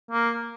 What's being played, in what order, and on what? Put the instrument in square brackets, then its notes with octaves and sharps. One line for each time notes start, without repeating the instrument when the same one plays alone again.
[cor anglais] A#3